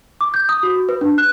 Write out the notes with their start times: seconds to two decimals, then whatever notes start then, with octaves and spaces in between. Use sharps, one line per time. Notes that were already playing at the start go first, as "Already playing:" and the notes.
0.21 D6
0.34 G6
0.49 D#6
0.63 F#4
0.89 B4
1.01 D4
1.18 F#6